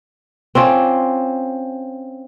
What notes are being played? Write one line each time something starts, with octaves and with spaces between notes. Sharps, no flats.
C4 C#4 F4 D5